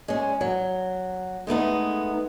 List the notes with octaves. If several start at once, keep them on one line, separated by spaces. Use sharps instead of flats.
G#3 C#4
F#3
G#3 A3 B3 D#4